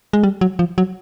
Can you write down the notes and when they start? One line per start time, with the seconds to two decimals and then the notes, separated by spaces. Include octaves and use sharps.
0.13 G#3
0.23 G3
0.41 F#3
0.59 F3
0.78 F#3